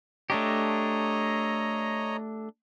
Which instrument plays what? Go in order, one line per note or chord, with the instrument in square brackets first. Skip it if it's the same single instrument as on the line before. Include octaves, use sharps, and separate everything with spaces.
[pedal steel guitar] A3 D4 G4 [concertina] C#5 D#5 A#5